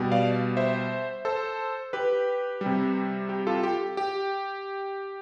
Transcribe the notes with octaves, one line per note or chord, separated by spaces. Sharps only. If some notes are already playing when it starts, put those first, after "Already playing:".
Already playing: B2 G3
D5 F5
C5 E5
A4 C5
G4 B4
C3 G3
G4
F4 A4
G4
G4